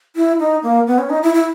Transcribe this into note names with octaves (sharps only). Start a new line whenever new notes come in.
E4
D#4
A#3
B3
C#4
D#4
E4
E4